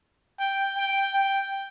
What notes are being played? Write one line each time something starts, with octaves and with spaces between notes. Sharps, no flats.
G5
G5
G5